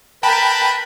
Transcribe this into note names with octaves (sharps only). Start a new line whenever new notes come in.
A#4 B4 G5 A5 B5